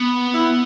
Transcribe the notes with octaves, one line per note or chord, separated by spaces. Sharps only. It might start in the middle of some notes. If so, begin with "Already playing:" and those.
Already playing: B3
E4